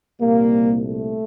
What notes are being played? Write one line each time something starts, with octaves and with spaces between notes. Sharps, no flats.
C2 A#2 G3 A#3
A3